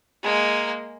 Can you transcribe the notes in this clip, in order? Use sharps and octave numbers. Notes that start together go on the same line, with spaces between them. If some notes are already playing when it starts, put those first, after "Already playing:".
G#3 A#3